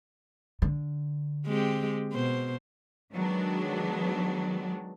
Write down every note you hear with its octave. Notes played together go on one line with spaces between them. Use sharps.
D3
G#3 C4 G4
B2 C5
D#3 F#3 G#3 B3 D4